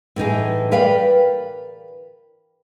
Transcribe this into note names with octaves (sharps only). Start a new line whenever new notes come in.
A2 E3 D#4 G#4
A#4 B4 D5 F5 G5